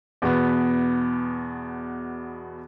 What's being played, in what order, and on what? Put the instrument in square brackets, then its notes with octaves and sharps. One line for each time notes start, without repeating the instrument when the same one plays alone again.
[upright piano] E2 B2 B3